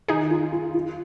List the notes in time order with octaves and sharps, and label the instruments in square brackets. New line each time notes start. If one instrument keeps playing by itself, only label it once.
[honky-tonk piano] D#3 [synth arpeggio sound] D#4 G#4
[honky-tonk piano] F4
F4
F4